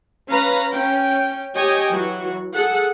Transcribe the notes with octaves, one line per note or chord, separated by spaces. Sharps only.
C#4 B4 F5 A#5 B5
C#4 G5
G4 C#5 D#5 G5 G#5
E3 F#3 F#4
G#4 A4 F#5